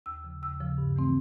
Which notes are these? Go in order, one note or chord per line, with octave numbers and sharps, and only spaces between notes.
D#2 E6
C#3 F3
D#2 E6
C#3 F3
G2
E3 A3 C4